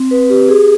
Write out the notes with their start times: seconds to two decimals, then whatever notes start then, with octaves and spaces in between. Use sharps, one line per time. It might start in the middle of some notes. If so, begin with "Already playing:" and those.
Already playing: C4
0.11 B4
0.30 G4
0.49 G#4